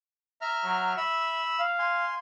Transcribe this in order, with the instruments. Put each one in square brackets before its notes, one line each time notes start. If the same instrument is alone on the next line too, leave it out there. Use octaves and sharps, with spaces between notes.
[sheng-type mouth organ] E5 A#5 F6
[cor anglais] F#3
[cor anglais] E5 [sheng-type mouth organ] B5 E6
[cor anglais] F5
[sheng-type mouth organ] G#5 C6